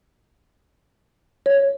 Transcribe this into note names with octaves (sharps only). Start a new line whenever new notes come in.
C#5